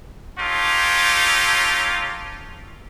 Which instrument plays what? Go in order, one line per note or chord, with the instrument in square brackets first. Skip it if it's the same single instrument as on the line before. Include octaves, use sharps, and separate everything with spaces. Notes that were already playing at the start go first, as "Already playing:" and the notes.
[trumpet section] D#4 F4 G4 A4 C#5